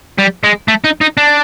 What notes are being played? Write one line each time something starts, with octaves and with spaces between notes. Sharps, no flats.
G3
G#3
A3
D#4
D#4
D4